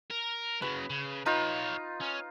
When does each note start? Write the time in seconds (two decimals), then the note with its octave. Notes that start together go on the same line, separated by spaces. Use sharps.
0.11 A#4
0.62 C#3 F#3 B4
0.90 C#3
1.26 D#4 F4 B4 C#5
2.01 C#4